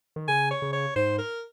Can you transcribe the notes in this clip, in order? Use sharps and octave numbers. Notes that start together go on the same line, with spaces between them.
D#3
C#3 G#5
C#5
C#3
C#5
G#2 C5
A#4